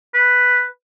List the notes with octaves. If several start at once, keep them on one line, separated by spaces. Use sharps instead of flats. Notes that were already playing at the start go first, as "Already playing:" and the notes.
B4